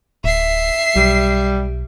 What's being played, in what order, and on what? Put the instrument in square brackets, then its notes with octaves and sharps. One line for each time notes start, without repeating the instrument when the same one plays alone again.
[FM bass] D1 [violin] E5 C7
[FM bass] B1 [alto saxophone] G3